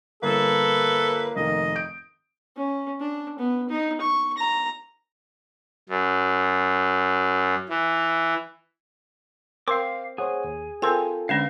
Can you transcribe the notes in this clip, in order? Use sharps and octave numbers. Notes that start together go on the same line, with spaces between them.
G1 A#3 A4 B4
F1 D#3 D#5
D#6 G6 D7
C#4
D4
B3
D#4
C#6
A#5
F#2
E3
C4 A#4 F5 D6
G#4 C5 C#5 F#5
D#2
C4 F4 A4 A#4 C5 G#5
D3 G#3 C#4 D4 F5